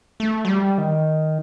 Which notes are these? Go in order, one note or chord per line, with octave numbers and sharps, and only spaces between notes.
A3
F#3
G3
D#3